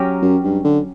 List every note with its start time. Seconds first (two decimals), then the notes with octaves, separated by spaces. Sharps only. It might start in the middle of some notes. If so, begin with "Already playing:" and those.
Already playing: F#3 C#4 G4 A#4
0.22 F#2
0.44 G2
0.64 D3